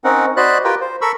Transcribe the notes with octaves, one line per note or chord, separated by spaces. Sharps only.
C4 C#4 D#4 A#4 F#5
F#4 C5 D5 D#5 B5 F#6
F4 G4 A#4 B4 G5
C5
A4 A#4 B5 C#6 E6